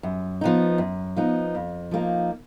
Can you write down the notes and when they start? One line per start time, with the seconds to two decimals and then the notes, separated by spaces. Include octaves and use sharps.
0.03 F#2
0.41 F3 B3 D#4
0.78 F#2
1.16 F3 B3 D#4
1.55 F2
1.91 F3 A#3 D#4